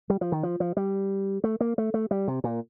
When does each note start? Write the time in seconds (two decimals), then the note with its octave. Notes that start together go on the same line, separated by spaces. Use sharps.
0.10 G3
0.21 F3
0.32 D#3
0.43 F3
0.60 F3
0.77 G3
1.44 A3
1.61 A#3
1.78 A3
1.94 A3
2.11 G3
2.28 C3
2.44 A#2